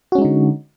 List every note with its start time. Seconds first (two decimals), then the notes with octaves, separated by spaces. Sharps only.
0.12 F#4
0.15 C#4
0.18 G#3
0.22 D#4
0.25 D3